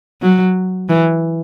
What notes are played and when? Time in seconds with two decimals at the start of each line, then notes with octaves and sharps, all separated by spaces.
0.22 F#3
0.89 E3